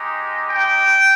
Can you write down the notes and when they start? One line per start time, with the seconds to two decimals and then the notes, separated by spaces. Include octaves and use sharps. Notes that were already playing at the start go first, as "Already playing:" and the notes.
Already playing: G#3 D#4 G4
0.51 G5